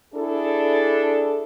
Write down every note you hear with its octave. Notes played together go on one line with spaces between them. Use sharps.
D4 E4 G#4 A4